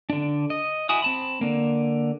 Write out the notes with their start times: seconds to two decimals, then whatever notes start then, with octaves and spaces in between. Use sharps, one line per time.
0.10 D3 D4
0.50 D#5
0.89 E4 F#4 G#5 D#6
1.02 C4 A5 B5
1.41 D3 A#3